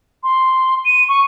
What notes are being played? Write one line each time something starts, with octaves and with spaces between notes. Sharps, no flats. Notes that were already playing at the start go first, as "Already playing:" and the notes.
C6
D#7
C#6